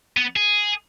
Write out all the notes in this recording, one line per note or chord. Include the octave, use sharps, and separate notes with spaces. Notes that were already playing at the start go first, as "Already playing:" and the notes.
B3
G#4